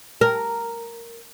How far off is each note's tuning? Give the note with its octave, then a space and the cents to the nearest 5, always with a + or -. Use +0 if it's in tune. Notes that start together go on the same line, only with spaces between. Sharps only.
A#4 -5